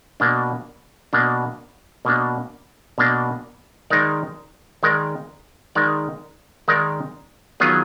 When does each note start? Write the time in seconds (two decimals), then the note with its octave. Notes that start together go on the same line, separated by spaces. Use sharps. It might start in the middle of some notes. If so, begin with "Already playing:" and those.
0.20 B2 A#3 D4
1.13 B2 A#3 D4
2.05 B2 A#3 D4
2.98 B2 A#3 D4
3.90 D#3 G#3 D#4 A#4 D5
4.83 D#3 G#3 D#4 A#4 D5
5.75 D#3 G#3 D#4 A#4 D5
6.68 D#3 G#3 D#4 A#4 D5
7.60 D#3 F#3 B3 F4 G#4